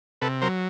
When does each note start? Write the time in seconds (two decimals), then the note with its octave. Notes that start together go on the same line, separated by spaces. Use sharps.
0.22 C3 A4 B4
0.42 F#3 A#4 C5